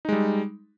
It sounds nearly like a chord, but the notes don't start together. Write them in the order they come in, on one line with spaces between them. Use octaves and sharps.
D#4 G#3 G3